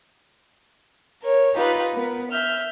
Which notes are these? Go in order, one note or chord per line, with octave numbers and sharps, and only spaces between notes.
A#4 C#5
D#4 F4 G4 B4
B3 A#4 B4
E5 F6 G6